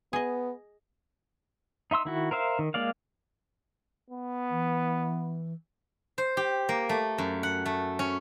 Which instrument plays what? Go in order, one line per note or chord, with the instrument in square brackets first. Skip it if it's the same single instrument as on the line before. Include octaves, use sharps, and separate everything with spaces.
[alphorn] B3 [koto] G#4 D#5
[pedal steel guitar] D#4 E5 C6 E6
D#3 E4 F#4
A#4 C5 E5 F5
D#3
G#3 A#3 D5 F5
[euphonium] B3
[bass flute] E3
[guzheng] C5
G4
A#3
A3
F#2
F#5
A3
C#4